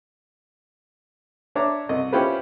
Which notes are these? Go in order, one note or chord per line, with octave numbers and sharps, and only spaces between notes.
D4 C#5 E5 A#5 D6
C2 D#5
C#4 E4 F4 G4 B4 C5